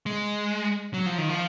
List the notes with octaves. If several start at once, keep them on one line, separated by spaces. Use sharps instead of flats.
G#3
F#3
F3
D#3
F3